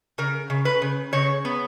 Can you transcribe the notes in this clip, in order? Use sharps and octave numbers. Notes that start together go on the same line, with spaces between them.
C#3 A#4
C#3
B4
C#3
C#3 C#5
B3